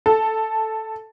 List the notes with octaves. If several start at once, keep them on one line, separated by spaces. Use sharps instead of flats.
A4